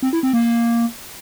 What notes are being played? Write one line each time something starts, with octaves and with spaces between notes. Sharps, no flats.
C4
E4
C4
A#3